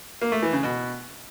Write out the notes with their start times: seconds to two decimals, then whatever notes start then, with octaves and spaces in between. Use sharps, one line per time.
0.22 A#3
0.32 A3
0.42 E3
0.53 C#3
0.63 B2